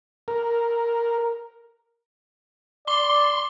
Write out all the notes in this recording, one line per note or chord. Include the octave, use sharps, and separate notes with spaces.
A#4
D5 C6 D6 G7